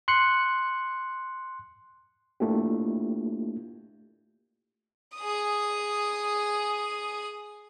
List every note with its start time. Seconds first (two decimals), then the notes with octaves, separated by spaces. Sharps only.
0.08 C6 F#6 C#7
2.40 A3 A#3 D4 E4 F4 G4
5.16 G#4 D#6